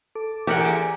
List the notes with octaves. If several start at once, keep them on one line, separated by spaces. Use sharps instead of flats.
A4 D6
E2 G4 G#4 A#4 F#5